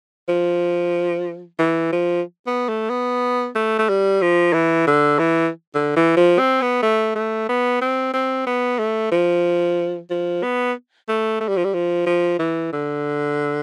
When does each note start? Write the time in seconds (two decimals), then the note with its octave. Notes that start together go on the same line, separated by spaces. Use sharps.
0.29 F3
1.59 E3
1.92 F3
2.47 B3
2.69 A3
2.90 B3
3.55 A3
3.79 A3
3.89 G3
4.22 F3
4.53 E3
4.87 D3
5.19 E3
5.75 D3
5.96 E3
6.17 F3
6.39 C4
6.62 B3
6.82 A3
7.15 A3
7.49 B3
7.82 C4
8.14 C4
8.47 B3
8.79 A3
9.12 F3
10.11 F3
10.43 B3
11.09 A3
11.40 A3
11.49 G3
11.57 F3
11.65 G3
11.74 F3
12.06 F3
12.39 E3
12.73 D3